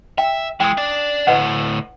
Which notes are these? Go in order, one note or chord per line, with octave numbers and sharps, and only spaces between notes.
E5 G5
E3 G#3 G5 D#6
D4 D5
D2 A2 B4 D#5 F#5